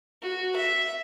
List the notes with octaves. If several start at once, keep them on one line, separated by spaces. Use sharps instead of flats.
F#4
E5